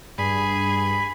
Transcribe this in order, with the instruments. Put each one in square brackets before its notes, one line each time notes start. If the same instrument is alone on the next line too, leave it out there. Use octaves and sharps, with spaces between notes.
[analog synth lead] G2 [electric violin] G#4 [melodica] B5